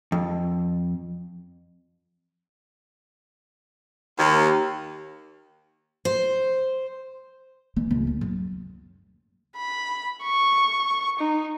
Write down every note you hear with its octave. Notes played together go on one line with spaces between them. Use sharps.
F2
D#2
C5
E3
C#2
D2
F#2
B5
C#6
D#4